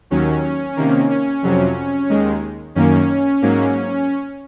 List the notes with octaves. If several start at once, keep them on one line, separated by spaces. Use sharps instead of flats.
D#2 D#3 F#3 C#4
C#4
C3 D#3 A#3
C#4
F2 C3 F#3
D#2 D#3 G#3
F#2 D#3 A#3 C#4
G#2 F#3 A#3